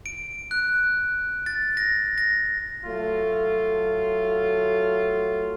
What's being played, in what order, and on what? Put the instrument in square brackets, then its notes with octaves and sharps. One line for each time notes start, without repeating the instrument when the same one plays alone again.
[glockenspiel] D7
F#6
A6
A#6
A#6
[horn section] F#3 A3 F4